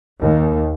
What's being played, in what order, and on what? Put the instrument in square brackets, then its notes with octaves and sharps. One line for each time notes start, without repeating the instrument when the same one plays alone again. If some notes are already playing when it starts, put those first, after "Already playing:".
[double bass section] D#2